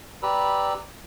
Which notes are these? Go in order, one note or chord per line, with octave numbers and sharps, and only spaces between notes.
G4 B4 D5 A#5 B5 E6